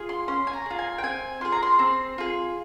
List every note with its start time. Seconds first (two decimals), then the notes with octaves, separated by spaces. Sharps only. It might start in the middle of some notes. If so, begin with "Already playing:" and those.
Already playing: F4 G#4
0.09 C6
0.28 C#4 C6
0.47 G#5
0.53 A#5
0.66 F4 G#4
0.79 G#5
0.98 G5
1.03 C4 G#5
1.41 F4 G#4 C6
1.52 A#5
1.63 C6
1.79 C4
2.18 F4 G#4